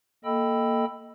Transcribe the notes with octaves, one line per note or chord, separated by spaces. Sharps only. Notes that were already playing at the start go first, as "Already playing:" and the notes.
A#3 A4 D#5 G5 B5 E6